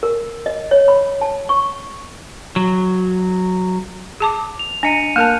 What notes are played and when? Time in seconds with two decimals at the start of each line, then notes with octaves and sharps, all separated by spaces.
0.03 A#4
0.46 D#5
0.71 C#5
0.88 B5
1.21 A5
1.49 C#6
2.56 F#3
4.20 G#4 A5 D6
4.59 F7
4.83 D4 D#5 G#5 C#7 D#7
5.16 A#3 A#4 A5 F#6 G6